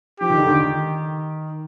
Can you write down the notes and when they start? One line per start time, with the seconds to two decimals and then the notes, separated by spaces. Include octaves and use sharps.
0.20 F3 G4
0.30 D#3
0.38 D3
0.48 D#3